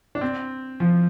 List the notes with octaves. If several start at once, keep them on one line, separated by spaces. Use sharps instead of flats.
D4
C4
F3